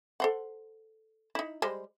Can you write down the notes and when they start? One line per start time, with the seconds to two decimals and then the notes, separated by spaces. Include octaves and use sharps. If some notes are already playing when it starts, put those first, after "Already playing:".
0.20 A4 C5 F#5
1.35 D#4 E4
1.62 G3 G#3 C5